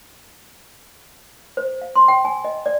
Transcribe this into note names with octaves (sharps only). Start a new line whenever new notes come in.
C5
F5
C6
G5
G#5
D#5
D5